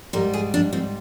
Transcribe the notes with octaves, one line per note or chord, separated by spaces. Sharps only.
G#2 G3 A#4
G#4
D4
C4